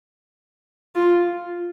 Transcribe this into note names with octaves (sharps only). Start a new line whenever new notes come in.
F4